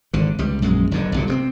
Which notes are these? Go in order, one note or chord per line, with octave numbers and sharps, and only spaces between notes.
G#1 D3
C#2 G3
A#1 F#2 G#3
F#1 G2 D3
G1 C2 A#2
C3 A3 C4